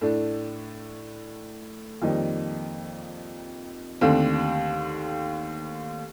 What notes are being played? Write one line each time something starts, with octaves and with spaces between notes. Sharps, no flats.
A2 A3 D4
F2 D#3 G3 A#3 D#4
D#2 D3 A3 C4